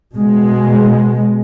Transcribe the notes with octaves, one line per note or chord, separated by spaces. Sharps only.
B2 G#3